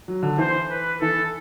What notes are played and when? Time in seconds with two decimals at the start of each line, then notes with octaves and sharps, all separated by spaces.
0.08 F#3
0.23 D3
0.38 E3 C5
0.70 B4
1.01 E3 A4